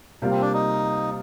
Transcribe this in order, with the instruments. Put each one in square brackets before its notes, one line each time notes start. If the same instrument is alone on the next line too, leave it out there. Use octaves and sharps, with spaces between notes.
[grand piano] C3 G3 A#3 F4
[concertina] C4
D4
D#4